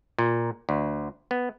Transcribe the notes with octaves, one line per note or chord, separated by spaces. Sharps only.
A#2
D2
B3